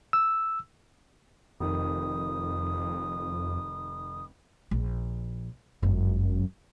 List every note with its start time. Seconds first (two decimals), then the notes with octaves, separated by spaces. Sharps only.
0.13 E6
1.60 F1 F2 D#3 D#6
4.71 A#1
5.82 G1 F#2 G#3